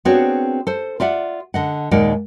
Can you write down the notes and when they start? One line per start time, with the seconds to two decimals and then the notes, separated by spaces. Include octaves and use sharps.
0.05 B3 C4 D4 F#4 G#4 C#5
0.67 A4 C5
1.00 F4 D5 E5 F#5
1.54 D3 D#5 F#5
1.91 D#2 A#2 G#3 D#4 D5 F#5